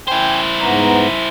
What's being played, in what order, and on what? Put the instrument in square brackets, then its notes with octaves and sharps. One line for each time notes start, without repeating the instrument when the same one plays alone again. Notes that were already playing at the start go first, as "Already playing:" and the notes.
[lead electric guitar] E4 C5 [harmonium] G5 G#5
[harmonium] G#2 B3 A#5